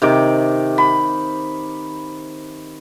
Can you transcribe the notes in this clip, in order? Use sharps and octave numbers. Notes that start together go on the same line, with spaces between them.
C3 D#3 D6
B5